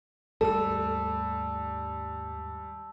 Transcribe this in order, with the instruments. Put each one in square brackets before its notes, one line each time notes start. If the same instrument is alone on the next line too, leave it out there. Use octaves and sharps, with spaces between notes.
[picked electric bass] D#2 G#2 A3 [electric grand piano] G3 [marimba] A4 [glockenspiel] A5 E6